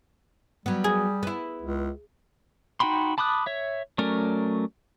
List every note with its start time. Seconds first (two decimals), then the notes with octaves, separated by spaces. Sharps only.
0.66 F#3 G3 B3
0.84 G#4
1.23 B3 E4
1.62 C#2
2.80 D#4 F#4 G5 B5 C6
3.18 A5 B5 D6 D#6 F#6
3.46 C#5 E5
3.98 F#3 A3 C#4 A#4 D5